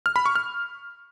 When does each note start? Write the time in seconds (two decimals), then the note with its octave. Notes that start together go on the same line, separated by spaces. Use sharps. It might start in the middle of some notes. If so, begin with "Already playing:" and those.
0.06 F6
0.16 B5
0.26 C#6
0.35 F6